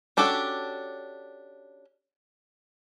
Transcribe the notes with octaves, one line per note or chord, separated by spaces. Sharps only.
C#4 D4 F#4 G4 A4